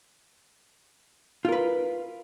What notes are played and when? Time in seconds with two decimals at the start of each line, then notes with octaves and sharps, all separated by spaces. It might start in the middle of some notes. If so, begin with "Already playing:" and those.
1.45 F4
1.49 A#4
1.52 B4